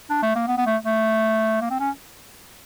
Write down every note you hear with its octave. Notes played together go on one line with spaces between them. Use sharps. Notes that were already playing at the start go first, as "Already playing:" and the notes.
D4
A3
A#3
B3
B3
A3
A3
A#3
C4
C#4